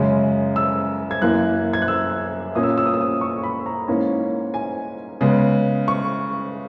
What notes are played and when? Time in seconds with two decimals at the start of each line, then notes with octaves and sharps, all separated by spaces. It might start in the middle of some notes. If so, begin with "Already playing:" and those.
Already playing: F#2 C#3 G#3 C#4
0.56 E6
1.11 G#6
1.21 F#2 E3 A#3 F#6
1.73 G#6
1.82 F#6
1.88 E6
2.55 A#2 A#3 C#4 D#6
2.63 E6
2.70 D#6
2.78 E6
2.86 D#6
2.94 E6
3.01 D#6
3.21 C#6
3.43 B5
3.66 A#5
3.88 G#2 E3 A#3 C#4
4.54 G#5
5.21 C#3 G#3 B3
5.88 C#6